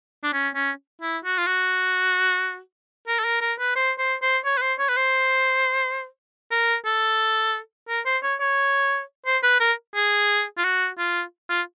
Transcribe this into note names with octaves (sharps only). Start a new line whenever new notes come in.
D4
C#4
C#4
E4
F#4
F4
F#4
A#4
A4
A#4
A#4
B4
C5
C5
C5
C#5
B4
C5
C#5
B4
C5
A#4
A4
A#4
C5
C#5
C#5
C5
B4
A#4
G#4
F4
F#4
F4
F4